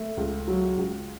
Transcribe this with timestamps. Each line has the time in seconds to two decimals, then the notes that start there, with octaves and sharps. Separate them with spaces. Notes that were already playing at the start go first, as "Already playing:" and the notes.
Already playing: A3
0.17 C#2
0.48 F#3
0.78 C#2